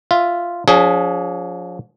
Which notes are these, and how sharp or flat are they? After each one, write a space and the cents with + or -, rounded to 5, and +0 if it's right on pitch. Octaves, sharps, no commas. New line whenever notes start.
F4 -5 E5 +0
F3 +30 D4 -40 G#4 +0